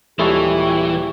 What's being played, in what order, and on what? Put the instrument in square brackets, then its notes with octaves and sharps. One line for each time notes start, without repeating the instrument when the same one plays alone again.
[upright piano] D#1 G3 C#6 [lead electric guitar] E3 [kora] G#3 E4 A4 [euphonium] G4